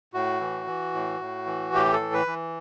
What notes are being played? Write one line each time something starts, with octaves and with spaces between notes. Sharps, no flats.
A2 F#4
E3
E3
A2
A2
E3
A2 G4
A4
E3
B4
E3